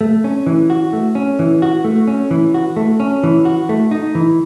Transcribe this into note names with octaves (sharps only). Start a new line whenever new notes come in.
A3
C#4
E3
F#4
A3
C#4
E3
F#4
A3
C#4
E3
F#4
A3
C#4
E3
F#4
A3
D#4
E3